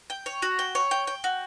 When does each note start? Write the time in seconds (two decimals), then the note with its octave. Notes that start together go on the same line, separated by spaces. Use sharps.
0.10 G5
0.26 C#5
0.42 F#4
0.59 G5
0.75 C#5
0.91 G5
1.07 G5
1.24 F#4